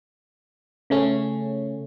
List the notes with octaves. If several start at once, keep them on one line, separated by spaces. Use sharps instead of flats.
C#3 A3 C#4